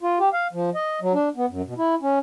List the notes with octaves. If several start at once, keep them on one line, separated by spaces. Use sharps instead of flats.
F4
G4
F5
F3
D#5
F#3
D4
B3
F#2
B2
E4
C#4